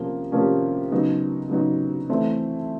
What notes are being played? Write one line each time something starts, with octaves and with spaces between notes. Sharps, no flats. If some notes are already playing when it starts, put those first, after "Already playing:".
Already playing: C3 F3 A#3 C#4
C3 F3 A#3 C#4
C#3 F#3 B3 D#4 F#4
C#3 F#3 B3 D#4 F#4
E3 A3 C4